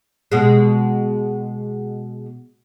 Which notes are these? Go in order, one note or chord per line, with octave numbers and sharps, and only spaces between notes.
B2 G#3